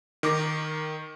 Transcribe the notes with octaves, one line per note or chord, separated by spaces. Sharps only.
D#3 D6 A#6